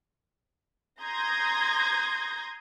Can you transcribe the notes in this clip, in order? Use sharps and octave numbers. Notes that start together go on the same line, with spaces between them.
A#5 C6 D#6 G6 G#6 A#6